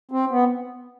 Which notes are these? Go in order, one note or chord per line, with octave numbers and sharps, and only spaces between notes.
C4
B3